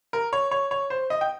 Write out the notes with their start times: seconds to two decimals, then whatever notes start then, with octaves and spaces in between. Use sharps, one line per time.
0.13 A#4
0.33 C#5
0.51 C#5
0.71 C#5
0.90 C5
1.10 D#5
1.21 G5